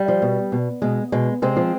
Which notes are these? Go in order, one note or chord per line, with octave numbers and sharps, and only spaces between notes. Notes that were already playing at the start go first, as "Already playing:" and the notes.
Already playing: G3
F3
B2
B2
B2 G#3
B2 G#3
C3 G#3 C4
F3